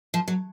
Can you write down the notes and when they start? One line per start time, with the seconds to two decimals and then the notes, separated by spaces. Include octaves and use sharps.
0.14 F3
0.28 F#3